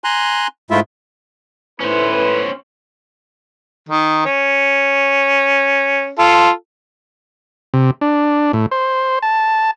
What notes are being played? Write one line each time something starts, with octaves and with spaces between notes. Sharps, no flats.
G#5 A#5 C6 F#6
G#2 G#3 A3 E4 F4 E5
A2 C#4 E4 B4 C5
D#3
C#4
F4 A4
C3
D4
A2
C5
A5